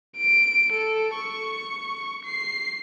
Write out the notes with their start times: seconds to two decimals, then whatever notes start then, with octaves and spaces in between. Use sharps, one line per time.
0.17 D7
0.73 A4
1.15 C#6
2.25 C7